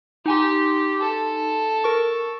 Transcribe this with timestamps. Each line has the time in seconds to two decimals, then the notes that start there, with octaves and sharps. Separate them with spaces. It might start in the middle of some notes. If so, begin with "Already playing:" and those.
0.26 D#4 G4 G#5 C6
1.01 A4
1.84 A#4 C#6